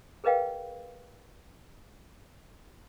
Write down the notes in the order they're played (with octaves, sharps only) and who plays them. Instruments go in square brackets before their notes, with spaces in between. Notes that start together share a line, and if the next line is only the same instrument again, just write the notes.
[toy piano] G#4 A#4 B4 D#5 F5 G5